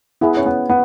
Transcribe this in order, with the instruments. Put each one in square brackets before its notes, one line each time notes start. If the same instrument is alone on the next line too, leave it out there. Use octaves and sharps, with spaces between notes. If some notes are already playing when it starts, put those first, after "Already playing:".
[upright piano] B3 [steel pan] E4 G#4 B4
[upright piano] C#4
B3
B3